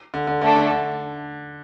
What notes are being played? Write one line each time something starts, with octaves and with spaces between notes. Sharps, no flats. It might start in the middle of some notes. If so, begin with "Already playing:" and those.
D3
D3
D3 A3 D4 A4
D3
D3